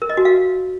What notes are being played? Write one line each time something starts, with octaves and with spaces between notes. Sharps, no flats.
A#4
D#5
F#4
F5